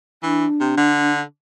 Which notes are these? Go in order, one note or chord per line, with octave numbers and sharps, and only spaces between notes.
E3 D4
C3
D3